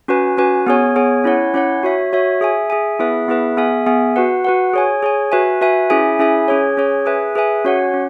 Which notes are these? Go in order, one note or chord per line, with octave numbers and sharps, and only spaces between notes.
C#4 F#4 B4 G#5
C#4 F#4 B4 G#5
B3 G#4 C#5 G#5
B3 G#4 C#5 G#5
C#4 E4 C#5 F#5
C#4 E4 C#5 F#5
F#4 C#5 E5
F#4 C#5 E5
G#4 E5 G#5
G#4 E5 G#5
B3 E4 G#4 B4 E5
B3 E4 G#4 B4 E5
B3 G#4 E5 G#5
B3 G#4 E5 G#5
F#4 B4 F#5
F#4 B4 F#5
G#4 C#5 G#5
G#4 C#5 G#5
F#4 B4 E5 G#5
F#4 B4 E5 G#5
C#4 E4 G#4 E5 G#5
C#4 E4 G#4 E5 G#5
C#4 G#4 C#5
C#4 G#4 C#5
G#4 B4 E5 G#5
G#4 B4 E5 G#5
C#4 F#4 C#5 F#5
C#4